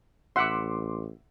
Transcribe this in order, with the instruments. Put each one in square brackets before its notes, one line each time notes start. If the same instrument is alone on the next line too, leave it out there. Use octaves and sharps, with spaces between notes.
[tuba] A1 [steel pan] E5 F#5 [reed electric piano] C6 D6